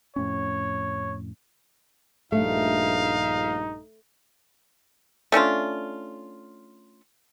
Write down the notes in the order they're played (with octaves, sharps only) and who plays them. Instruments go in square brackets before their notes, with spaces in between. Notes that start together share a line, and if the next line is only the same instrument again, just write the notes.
[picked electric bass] F2 A2 C#4 [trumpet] C#5
[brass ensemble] A#1 G2 [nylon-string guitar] A3 [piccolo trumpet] D#4 [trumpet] F5
[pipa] A3 C#4 D4 F4